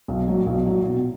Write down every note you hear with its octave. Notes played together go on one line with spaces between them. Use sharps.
B1
A#2 F#3
B1
A#2 F#3
B2